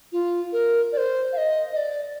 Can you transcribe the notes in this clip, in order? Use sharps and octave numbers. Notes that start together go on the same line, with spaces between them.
F4
A#4
D5
C5
F5
D#5
D#5
D5